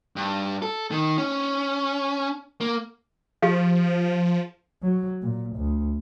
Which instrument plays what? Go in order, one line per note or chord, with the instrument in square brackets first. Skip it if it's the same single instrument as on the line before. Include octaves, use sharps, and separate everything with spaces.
[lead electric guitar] G2
A4
D#3
C#4
A#3
[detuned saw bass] F3 [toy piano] G4 G#4 F5
[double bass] F#3
A#2
D2